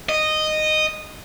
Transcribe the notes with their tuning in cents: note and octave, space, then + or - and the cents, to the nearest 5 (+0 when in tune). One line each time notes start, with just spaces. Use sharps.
D#5 -10